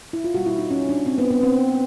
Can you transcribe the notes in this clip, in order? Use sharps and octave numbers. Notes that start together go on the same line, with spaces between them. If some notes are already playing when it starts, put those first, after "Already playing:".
E4
F4
B2 G3 A#3 F#4
E4
D#4
C#4
D4
C4
B3
B3
C4